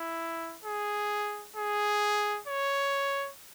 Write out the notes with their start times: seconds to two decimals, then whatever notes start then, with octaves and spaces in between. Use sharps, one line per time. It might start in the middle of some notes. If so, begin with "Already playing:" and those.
Already playing: E4
0.64 G#4
1.56 G#4
2.47 C#5